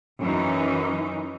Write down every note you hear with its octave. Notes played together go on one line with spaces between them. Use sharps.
F#2 E3 C#4 D#4